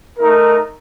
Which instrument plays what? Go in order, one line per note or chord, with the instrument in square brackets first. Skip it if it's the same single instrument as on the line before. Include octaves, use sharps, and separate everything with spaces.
[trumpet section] A3 D#4 A#4